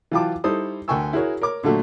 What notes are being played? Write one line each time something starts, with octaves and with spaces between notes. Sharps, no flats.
E3 F#3 F4 G5 A5 D6
G3 D#4 E4 A4 C5 D#6
D2 A#4 G5 G#5 C#6 E6
E4 F#4 G#4 A#4 C#5
A#4 C#5 D6
A#2 D3 F#3 A3